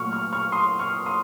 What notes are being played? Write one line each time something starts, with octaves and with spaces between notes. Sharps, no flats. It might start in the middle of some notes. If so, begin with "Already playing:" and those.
Already playing: A#2 F#3 A3 C#6 F6
C#6 F6
C#6 F6
C6 D#6
C#6 F6
C6 D#6